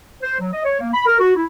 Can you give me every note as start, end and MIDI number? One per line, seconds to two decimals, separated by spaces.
0.22 0.37 72
0.40 0.48 54
0.53 0.62 75
0.64 0.76 73
0.80 0.90 58
0.93 1.06 83
1.06 1.17 70
1.20 1.31 66
1.35 1.44 64